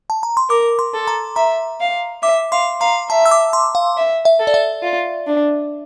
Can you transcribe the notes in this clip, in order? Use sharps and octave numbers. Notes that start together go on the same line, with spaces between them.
A5
A#5
C6
A#4 D6
C6
A4
A#5
E5 A#5
F5
E5 D6
F5 C6
F5 A#5
E5 A5
E6
D6
C6
F5
E5
E5
A4
D5
E5
F4
D4